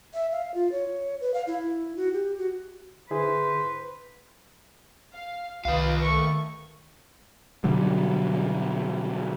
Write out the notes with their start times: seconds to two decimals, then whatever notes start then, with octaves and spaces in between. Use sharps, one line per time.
0.14 E5
0.32 F5
0.54 F4
0.72 C#5
1.21 B4
1.34 F5
1.47 E4
1.97 F#4
2.13 G4
2.38 F#4
3.11 D3 E4 G#4 B4 C5
5.12 F5
5.65 C2 D#3 F4 B4 F5
6.03 A3 C#6
7.64 B2 D3 F#3 G3